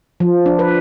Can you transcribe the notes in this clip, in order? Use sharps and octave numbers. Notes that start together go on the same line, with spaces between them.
F3
D4
B4